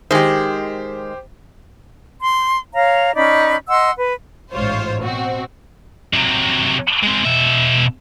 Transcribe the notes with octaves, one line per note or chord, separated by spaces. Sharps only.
D#3 G#3 G4 C5
C6
C#5 F5 A#5
C#4 D#4 D5 B5
D#5 F#5 C6 E6
B4
A1 G#2 F4 C5 C#5
B2 C4 F#4
C3 F#3
G#3 C4
B2 E5